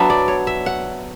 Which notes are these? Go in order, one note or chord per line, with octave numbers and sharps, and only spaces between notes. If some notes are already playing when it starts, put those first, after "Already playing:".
Already playing: F#3 B3 D4 E5
D5
C#5
E5
F#5